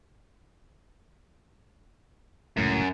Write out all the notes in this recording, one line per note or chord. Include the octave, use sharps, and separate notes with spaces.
F1 C#2 F#2 A2